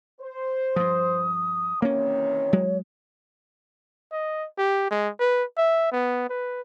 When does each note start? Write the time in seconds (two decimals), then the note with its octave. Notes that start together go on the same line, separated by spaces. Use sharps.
0.21 C5
0.76 G2 F3 D#6
1.82 C3 D#3 E3 A#3 C#4 C#5
2.53 F#3 G#3
4.12 D#5
4.58 G4
4.91 G#3
5.20 B4
5.58 E5
5.92 B3
6.30 B4